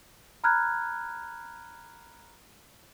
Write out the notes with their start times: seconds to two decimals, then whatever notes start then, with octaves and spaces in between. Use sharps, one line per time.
0.44 A#5 B5 F6 F#6 G#6